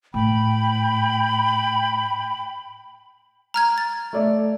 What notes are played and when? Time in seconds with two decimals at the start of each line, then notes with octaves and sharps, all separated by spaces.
0.14 A2 G5 B5
3.54 A#5 F6 G#6
3.78 A6
4.13 A3 D5 E5